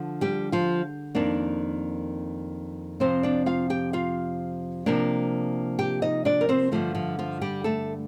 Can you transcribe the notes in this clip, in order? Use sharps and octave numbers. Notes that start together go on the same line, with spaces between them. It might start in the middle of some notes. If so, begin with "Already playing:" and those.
Already playing: D3 F3
G3 G4
F3 F4
F2 D#3 A#3 D4
F2 C3 F3 C4 C5
D4 D5
F4 F5
G4 G5
F4 F5
C3 F3 A#3 D4
G4 G5
D#4 D#5
D4 D5
A#4
C4 C5
G2 D3 F3 A3 F4
F3 F4
F3 F4
G3 G4
A3 A4